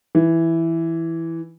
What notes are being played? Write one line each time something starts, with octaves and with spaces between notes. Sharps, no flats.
E3